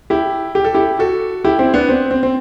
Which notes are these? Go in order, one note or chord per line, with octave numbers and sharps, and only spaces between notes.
E4 G4
G4
A4
E4 G4
F#4 A4
E4 G4
C4 E4
B3 D4
C4
C4
C4